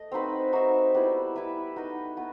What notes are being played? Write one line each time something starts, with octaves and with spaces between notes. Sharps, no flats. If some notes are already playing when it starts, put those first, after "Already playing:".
Already playing: A3 D#5
C4 D#4 F#4 B4
D#4 F#4 C5 E5
G3 B3 E4
E4 B4 E5
D#4 F#4 B4 D#5
B3 F#4 B4